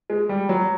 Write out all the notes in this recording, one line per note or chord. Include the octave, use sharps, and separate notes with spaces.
G#3
G3
F#3